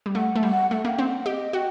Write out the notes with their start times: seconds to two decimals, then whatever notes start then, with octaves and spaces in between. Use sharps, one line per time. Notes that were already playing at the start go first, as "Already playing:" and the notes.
0.06 G3
0.15 A3 F#5
0.36 A3
0.43 G3 F#5
0.71 A3 F#5
0.85 A#3
0.89 G5
0.99 C4
1.07 F#5
1.21 F#5
1.26 G4 D#5
1.53 F#4 G5